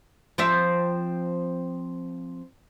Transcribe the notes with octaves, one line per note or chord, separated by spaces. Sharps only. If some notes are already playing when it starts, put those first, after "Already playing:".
F3 C4 E5